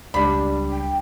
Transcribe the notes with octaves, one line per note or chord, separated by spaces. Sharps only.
C#2 G3 D4 B5
G5